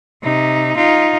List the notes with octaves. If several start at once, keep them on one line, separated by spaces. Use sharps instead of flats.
C3 D#4
D#4 F4